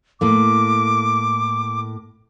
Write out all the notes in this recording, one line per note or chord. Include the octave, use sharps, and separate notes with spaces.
A2 A#3 D6